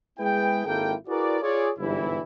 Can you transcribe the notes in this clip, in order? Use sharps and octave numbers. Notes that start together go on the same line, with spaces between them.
G#3 B3 E4 G#4 B4 G5
G#1 G#3 A#3 E4 A4 G5
E4 F#4 G#4 A#4 B4 D5
F4 G#4 C#5 D5
G1 G#2 B2 E3 G3 E4